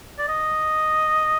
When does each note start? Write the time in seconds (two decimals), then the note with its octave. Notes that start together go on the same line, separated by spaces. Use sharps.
0.18 D5
0.29 D#5